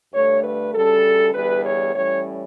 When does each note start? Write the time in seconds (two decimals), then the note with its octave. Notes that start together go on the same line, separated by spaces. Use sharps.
0.13 G2 D3 A3 D4 C#5
0.43 B4
0.74 D2 C#3 G3 C#4 A4
1.34 E2 D3 G3 B4
1.65 C#5
1.94 A2 E3 G3 C#4 C#5